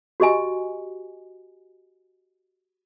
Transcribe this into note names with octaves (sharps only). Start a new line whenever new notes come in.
F#4 G4 D#5 G#5